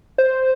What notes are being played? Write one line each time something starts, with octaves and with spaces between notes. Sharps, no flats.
C5